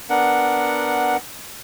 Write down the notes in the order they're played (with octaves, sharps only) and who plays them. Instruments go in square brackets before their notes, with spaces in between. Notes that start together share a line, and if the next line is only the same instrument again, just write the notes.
[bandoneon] B3 D4 A#4 F#5